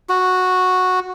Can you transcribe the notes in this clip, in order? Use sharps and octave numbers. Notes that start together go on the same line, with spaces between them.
F#4